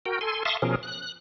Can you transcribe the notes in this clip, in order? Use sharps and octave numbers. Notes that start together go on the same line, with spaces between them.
F#4 A#4 G5
A4 G#5 C6
E5 F5 A5 C6 C#6 D#6
B2 F3 C#4 G#4 A#4
F#6